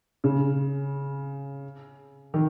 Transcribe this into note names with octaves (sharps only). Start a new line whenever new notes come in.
C#3
D#3